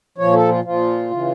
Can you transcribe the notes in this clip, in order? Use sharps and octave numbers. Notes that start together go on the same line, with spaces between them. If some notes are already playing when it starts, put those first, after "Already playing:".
A#2 F3 C#5
A4
F4
A#2 F3 F4
C#3 E3